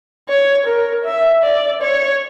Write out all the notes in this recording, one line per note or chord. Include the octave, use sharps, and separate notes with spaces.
C#5
A#4
E5
D5
C#5